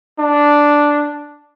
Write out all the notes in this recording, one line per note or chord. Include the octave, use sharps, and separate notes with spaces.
D4